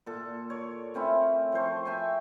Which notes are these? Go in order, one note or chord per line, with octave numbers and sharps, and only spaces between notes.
A#2 A4
C#5 D5
A3 C4 C#4 E4
F3 A4 C5 C#6
E5 G5 G#5 C#6